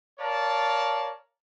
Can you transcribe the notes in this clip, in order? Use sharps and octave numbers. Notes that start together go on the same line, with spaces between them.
A#4 C#5 D5 F5 A5